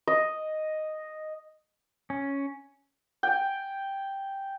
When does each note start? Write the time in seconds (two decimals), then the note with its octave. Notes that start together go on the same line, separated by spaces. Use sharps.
0.07 D#5
2.10 C#4
3.23 G5 G#5